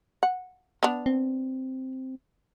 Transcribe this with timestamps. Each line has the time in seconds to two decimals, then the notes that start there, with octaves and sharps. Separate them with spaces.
0.23 F#5
0.83 B3 D4
1.06 C4